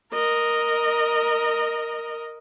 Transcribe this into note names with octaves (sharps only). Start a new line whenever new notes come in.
A#4 D#5